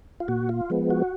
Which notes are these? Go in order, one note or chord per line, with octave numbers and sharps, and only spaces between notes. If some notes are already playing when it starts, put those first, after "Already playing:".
F4
A#2 F#4
F4
F3 G#3 B3
F#4